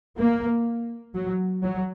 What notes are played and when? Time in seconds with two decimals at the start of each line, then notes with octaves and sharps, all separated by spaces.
0.16 A#3
1.13 F#3
1.63 F#3